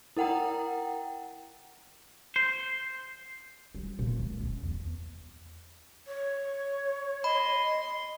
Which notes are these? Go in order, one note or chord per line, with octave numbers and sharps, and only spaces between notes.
E4 A#4 F#5 G5 A#5
C5
G3
A#2
C#2
C#4
E2
C#5
D#5 B5 C6